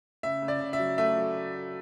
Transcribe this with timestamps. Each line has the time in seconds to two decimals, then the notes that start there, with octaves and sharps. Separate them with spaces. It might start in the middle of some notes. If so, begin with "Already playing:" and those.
0.23 C#3 E5
0.42 C#3
0.48 D5
0.61 C#3
0.73 E5
0.79 F#3
0.98 A3 E5
1.17 F#3